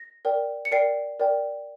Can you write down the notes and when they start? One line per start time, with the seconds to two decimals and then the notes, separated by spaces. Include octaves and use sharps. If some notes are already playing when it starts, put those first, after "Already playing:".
Already playing: A#6
0.25 A#4 D5 G5
0.65 C#7
0.71 A#4 D5 G5 C7 D7
1.20 A#4 D5 G5